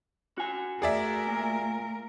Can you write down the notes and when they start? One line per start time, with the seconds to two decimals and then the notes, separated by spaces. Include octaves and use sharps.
0.38 F#4 G#5
0.82 A3 G#4 A#4 D5 E5
1.27 A#2